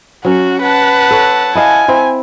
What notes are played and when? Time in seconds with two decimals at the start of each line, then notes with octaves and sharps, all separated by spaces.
0.25 F#3 C#4 F#4
0.62 B4 F#5 A5
1.11 A4 C#5
1.55 E4 D#5 F5 G#5
1.88 C4 E4